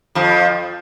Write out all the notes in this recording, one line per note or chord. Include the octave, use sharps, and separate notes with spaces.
F2 F3